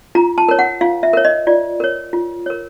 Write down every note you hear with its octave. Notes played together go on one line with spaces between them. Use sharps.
F4 A#5
A5
A#4 C#5
F#5
F4 F5
E5
A#4 C#5
D#5
F4 D5
A#4 C#5
F4
A#4 C#5